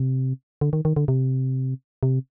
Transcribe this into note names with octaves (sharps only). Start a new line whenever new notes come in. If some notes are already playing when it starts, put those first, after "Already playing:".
Already playing: C3
D3
D#3
D#3
D3
C3
C3